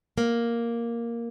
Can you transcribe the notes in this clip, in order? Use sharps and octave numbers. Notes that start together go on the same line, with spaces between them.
A#3